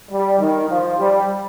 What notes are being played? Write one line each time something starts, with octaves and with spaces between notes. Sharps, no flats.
G3
D#3
F3
G3